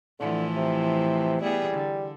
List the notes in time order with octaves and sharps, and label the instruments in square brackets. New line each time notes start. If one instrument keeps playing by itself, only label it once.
[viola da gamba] A2 E3 F3 [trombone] D3
[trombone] C3
[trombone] G3 [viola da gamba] B3 E4 G#4
[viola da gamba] D3